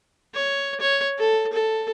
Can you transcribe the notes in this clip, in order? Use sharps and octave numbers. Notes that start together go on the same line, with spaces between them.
C#5
C#5
A4
A4